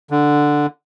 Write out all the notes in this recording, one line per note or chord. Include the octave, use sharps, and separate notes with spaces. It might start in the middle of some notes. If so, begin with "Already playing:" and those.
D3